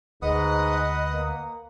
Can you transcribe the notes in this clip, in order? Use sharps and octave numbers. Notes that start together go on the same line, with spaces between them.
D2 G#2 B4 D#5 F#5 D#6
A#3